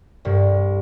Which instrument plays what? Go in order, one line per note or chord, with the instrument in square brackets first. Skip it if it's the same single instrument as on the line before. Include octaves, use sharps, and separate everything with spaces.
[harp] C2 G2